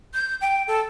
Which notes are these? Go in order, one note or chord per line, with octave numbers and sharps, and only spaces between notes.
G6
G5
A4